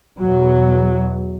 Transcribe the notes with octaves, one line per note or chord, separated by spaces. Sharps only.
E2 B2 F#3